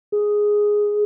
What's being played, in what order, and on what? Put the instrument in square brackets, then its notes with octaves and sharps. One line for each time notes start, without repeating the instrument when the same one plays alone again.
[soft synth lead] G#4